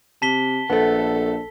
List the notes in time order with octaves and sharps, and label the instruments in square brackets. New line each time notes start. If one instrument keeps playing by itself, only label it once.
[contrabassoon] C3 [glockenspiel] A5 B6 G7
[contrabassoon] A#1 [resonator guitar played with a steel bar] A3 B3 [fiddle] A4